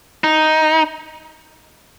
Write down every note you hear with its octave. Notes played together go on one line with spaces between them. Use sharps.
D#4